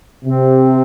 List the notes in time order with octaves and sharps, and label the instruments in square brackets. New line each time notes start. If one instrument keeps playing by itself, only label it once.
[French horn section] C3 [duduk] C4